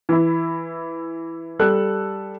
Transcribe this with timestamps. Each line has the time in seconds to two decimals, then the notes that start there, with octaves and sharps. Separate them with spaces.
0.09 E3 E4
1.59 G3 A4 F#6